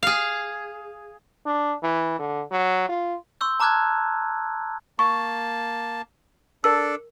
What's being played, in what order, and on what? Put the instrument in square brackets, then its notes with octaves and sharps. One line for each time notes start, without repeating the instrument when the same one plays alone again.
[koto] G#4 F5
[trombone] D4
E3
D3
F#3
F4
[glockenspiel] C6 C#6 E6 G6
A5 A#5 D6 F6 F#6 G#6
[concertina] A#3 A5 [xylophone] C#6
[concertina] D4 A4 [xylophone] A#4 E6